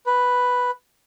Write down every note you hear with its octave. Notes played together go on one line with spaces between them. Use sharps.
B4